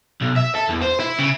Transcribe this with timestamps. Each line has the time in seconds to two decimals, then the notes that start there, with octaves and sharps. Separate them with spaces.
0.21 B1
0.36 E5
0.55 A4
0.69 E2
0.82 C5
1.00 E4
1.19 C#3